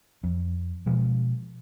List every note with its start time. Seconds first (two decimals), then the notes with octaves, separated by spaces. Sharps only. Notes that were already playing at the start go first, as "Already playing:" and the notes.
0.24 F2
0.86 B2 F3 G#3